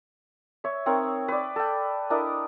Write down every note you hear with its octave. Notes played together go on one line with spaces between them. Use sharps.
C#5 E5
C4 D#4 A#4 C#5
B4 D5
A4 G5
D4 E4 A#4 D#5